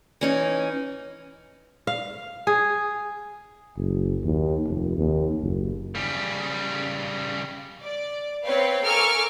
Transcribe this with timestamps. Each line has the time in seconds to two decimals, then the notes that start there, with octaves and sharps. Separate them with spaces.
0.21 E3 C#4 D#4
1.87 F5
2.47 G#4
3.76 F#1
4.24 D#2
4.66 F1
4.98 D#2
5.42 F#1
5.95 C#3 G3
7.81 D5
8.44 C4 B4 C#5 F5 G5
8.83 A4 A#4 G#5 C#6 D6 F6